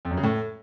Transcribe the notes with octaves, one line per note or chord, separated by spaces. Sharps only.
F2
F#2
C#3
A2